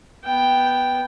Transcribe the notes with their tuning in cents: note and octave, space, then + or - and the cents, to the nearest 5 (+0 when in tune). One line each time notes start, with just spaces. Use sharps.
B3 +0 G5 +0